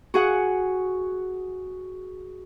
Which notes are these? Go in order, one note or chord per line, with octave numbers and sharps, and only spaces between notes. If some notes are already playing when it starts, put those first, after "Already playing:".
F#4 G#4 F#5